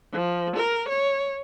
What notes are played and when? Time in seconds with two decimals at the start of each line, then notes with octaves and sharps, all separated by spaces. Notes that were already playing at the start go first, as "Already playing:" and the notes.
0.13 F3
0.57 A#4
0.89 C#5